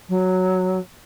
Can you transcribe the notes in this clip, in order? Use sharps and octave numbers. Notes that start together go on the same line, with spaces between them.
F#3